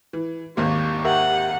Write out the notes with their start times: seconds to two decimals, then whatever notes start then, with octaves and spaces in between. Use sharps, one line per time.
0.13 E3
0.57 G#1 D#2 D#3 G3 A#3 C#6
1.05 G4 A#4 E5 F#5